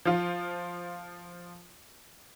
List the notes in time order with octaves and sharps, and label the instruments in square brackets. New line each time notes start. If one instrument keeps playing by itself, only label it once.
[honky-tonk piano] F3 F4